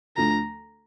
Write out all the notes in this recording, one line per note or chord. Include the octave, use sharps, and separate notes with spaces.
D2 D3 F3 A3 A#5